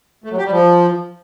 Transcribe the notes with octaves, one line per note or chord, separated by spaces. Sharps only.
A3
F#3
G4
G3
F3